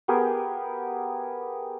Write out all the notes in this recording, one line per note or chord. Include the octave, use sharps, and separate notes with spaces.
B3 G4 G#4 A#4